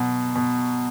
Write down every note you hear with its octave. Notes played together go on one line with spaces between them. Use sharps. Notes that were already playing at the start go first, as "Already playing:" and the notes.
Already playing: B2 F#3
B2